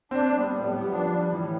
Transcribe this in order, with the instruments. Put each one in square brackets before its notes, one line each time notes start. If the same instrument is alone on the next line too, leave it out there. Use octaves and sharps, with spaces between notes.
[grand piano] C4 [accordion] D4
[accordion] G3
[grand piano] B3
[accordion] A2
[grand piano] G3
[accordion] B3
[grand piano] G3
[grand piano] F3 [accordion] D4
[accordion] G3
[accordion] A2 [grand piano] E3